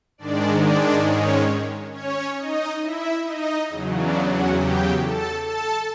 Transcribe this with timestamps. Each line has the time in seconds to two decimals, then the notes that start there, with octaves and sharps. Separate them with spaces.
0.18 G#2 D#3 G#3 D4 D5
0.63 D4 D5
1.06 C#4 C#5
1.93 C#4 C#5
2.38 D#4 D#5
2.82 E4 E5
3.25 D#4 D#5
3.69 E2 C#3 F#3
3.98 D4 D5
4.27 F#4 F#5
4.57 G4 G5
5.01 A4 A5
5.45 A4 A5